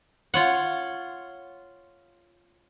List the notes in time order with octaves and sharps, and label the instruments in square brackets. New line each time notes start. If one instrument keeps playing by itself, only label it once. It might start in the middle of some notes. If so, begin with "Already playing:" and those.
[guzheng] F4 C#5 F#5